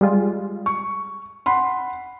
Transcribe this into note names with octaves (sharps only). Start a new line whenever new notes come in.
G3 G#3 F4
C#6
F#5 B5 C6